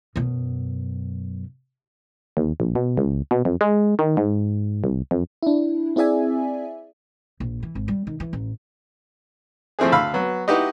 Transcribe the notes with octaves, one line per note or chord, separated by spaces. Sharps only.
F#2 B2
D#2
A#1
B2
C#2
B2
F2
G#3
D#3
G#2
C2
F2
D4 E4
C4 E4 G#4 D5 E5 G#5
A#1
E3
G#1
G3
D#3
E3
A1
F3 A3 C4 E4 G#4
D2 F5 B5 E6
F#3 B3
D#4 E4 F#4 G4 B4 D#5